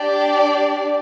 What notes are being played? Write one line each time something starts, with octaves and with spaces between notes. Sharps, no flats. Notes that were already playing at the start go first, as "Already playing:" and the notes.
Already playing: D4 G4 D5